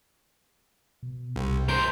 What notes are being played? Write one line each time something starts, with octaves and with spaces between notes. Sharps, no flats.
B2
C2 C3
A#4 C5 G6